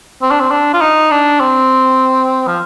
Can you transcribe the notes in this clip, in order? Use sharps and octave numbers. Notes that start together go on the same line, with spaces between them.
C4
D4
C4
D4
F4
D#4
D4
C4
F3